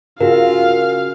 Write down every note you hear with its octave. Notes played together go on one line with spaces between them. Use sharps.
C#3 F4 F#4 G#4 A#4 F5